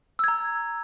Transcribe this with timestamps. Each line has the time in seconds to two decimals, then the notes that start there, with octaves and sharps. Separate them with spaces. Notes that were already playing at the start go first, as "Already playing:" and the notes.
0.19 E6
0.24 G#6
0.28 A#5